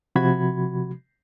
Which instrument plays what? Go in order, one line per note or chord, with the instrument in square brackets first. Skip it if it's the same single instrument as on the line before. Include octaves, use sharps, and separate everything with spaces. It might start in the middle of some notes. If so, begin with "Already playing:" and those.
[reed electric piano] C3 F3 F#4 B5 G#6